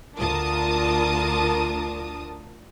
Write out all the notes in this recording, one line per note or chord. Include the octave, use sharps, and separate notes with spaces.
D2 D4 F4 A#4 A5 D#6